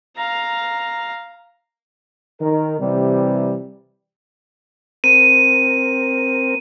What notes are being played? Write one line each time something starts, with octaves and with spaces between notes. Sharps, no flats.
F5 A#5
D#3 A#4
C3 E3 G3
C4 A#4 D#7